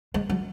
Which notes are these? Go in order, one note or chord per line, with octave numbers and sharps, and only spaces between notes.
G#3
F#3